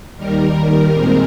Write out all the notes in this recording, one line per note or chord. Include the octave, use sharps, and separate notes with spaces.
D#2 D#3 G3 A#4
A#2 G#3 C4